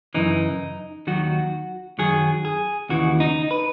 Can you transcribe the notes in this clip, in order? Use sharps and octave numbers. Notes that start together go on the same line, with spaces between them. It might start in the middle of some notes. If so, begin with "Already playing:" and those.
F#2 C#3 E3 D#4
D#2 D#3 F#3 F#4
F#2 D#3 F#3 G#4
G#4
D#2 C#3 E3 F#4
D#4
B4